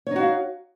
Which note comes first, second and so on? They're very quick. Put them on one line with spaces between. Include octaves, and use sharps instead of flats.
C#5 D#4 F#4 F5